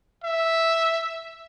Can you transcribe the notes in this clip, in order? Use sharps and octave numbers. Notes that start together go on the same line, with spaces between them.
E5